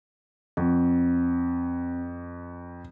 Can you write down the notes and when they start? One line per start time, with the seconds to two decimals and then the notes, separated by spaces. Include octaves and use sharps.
0.57 F2 C4